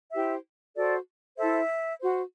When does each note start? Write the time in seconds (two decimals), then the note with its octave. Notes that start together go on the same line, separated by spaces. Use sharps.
0.13 E4 G4 C5 E5
0.76 F#4 A4 C5 D5
1.38 E4 A4 C5 E5
2.00 F#4 C5